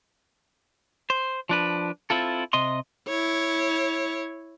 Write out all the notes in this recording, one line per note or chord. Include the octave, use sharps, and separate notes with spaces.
C5
F3 D4 B4
C4 E4 F4 A4
C3 D#5 C6
E4 C#5